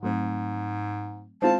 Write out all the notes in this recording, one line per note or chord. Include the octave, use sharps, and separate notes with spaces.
G#2 F#3 A3 C4
G#3 C4 E4 F4 A5